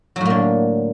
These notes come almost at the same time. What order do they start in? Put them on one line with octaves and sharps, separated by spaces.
F#3 A2 A#3 D3